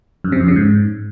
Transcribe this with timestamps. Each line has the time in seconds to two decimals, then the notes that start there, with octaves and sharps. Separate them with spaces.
0.24 F#2
0.32 C3
0.40 F2
0.48 C#3
0.56 G#2